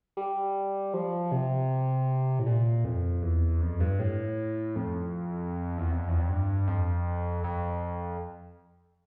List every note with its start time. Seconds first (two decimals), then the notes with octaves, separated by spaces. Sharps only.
0.17 G3
0.94 F3
1.32 C3
2.39 A2
2.46 A#2
2.84 F2
3.22 E2
3.61 F2
3.80 G2
3.99 A2
4.76 F2
5.78 E2
5.91 F2
6.08 E2
6.19 F2
6.29 G2
6.67 F2
7.44 F2